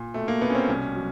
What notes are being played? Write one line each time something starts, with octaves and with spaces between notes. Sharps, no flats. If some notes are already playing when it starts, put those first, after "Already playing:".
Already playing: A#2
B2 A3
A#3
B2 B3
C#4
C4
C2 C#4
F#3